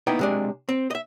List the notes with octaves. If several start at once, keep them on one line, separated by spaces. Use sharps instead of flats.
A#3 B3 D#4 E4 G5
C3 G#3 D4
C4
D#5 E5